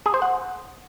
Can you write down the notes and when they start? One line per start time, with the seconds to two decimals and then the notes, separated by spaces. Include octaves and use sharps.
0.06 G#4
0.14 C5
0.22 F#5